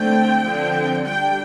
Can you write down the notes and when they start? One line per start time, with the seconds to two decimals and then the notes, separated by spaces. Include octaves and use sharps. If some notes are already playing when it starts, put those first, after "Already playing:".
Already playing: D3 A3 C4 G5
0.44 D3 F3 C4
1.05 G3 D4 G5